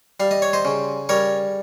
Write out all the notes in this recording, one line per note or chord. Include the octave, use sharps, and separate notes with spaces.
G3 F5
D#5
C#5
C5 D#5
C#3
G3 A#4 C#5